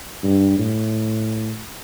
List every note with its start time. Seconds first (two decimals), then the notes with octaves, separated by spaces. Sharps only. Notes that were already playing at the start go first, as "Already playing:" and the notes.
0.23 G2
0.58 A2